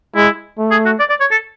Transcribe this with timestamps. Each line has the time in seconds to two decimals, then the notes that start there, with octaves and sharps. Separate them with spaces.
0.16 G#3 E4
0.58 A3
0.71 G#4
0.85 F#4
0.99 D5
1.10 D5
1.20 C#5
1.31 A4